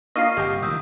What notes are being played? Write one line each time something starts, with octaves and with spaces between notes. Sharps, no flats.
A#3 D4 F4 D#5 F5 C#6 F6 D#7
G1 C3 G4 G5
A1 A#2 D#3 D#6 E6 G6